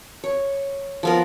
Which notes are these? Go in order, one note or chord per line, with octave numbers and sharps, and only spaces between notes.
C#5
F3 B3 A#4